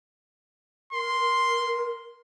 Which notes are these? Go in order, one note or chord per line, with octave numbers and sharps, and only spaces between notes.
A#4 C6